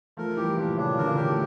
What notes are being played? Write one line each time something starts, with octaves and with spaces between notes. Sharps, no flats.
F3 A3 A#4
E3 G3 G4
A#2 D4
C#3 D4
D3 A#4
C#3 E3
G4
A3